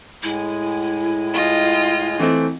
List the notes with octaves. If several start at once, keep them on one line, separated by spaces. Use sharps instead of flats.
A2 G#3 E4 G#5
F4 D#5
E3 A3 C4